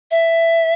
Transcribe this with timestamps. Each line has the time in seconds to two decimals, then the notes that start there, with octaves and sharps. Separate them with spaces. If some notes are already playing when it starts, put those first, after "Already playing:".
0.11 E5